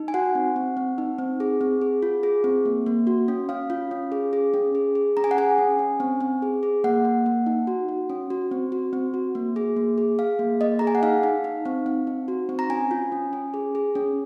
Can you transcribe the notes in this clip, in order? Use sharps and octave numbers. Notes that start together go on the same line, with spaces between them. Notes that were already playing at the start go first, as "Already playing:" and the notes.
Already playing: D#4
G#5
F#4 F#5
C4
C4
C4
D#4
C4
G#4
C4
G#4
F4
G#4
C4
A#3
A#3
F#4
C#4
C#4 F5
F4
C#4
G#4
G#4
C#4
G#4
G#4
C#4 A#5
G#5
F#5
G#4 G#5
C#4
C#4
C4
C4
G#4
G#4
A#3 F#5
A#3
A#3
D#4
F#4
F#4
C#4
F#4
C4
F#4
C4
F#4
A#3
G#4
A#3
G#4
G#4 F5
A#3
A#3 D#5
G#4 A#5
G#5
F#5
D#4 F5
D#4
D#4
C4
C4
D#4
F#4
C4
A#5
C#4 G#5
F4
C#4
C#4
G#4
G#4
C#4